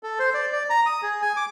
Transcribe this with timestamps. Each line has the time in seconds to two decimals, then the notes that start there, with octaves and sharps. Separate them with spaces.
0.03 A4
0.19 C5
0.34 D5
0.52 D5
0.70 A#5
0.86 D#6
1.03 G#4
1.22 G#5
1.37 D6